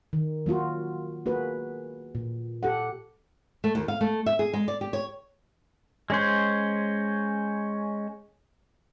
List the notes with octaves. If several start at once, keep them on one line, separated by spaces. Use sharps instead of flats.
D#3
F#3 A#3 F4 F#4
A#3 F#4 G#4 B4
A#2
G4 A4 F#5
A3
D#2
F5
A3
E5
G#4
G#3
D5
G4
C#5
G#3 C#4 C5